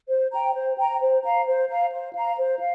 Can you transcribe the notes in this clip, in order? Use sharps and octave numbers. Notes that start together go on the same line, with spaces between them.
C5
G5 A#5
C5
G5 A#5
C5
F5 A#5
C5
F5 A#5
C5
F5 A#5
C5
F5